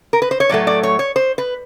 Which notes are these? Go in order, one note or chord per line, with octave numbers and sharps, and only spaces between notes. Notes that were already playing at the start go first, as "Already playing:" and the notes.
A#4
B4
C5
C#5
A2 F#3 A3 D5
D5
C#5
C#5
C5
B4